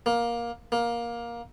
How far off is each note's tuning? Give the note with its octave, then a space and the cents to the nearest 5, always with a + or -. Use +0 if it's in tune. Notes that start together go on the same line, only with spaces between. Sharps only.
A#3 +15
A#3 +15